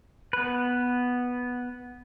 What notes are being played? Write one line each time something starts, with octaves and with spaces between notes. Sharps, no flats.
B3 B4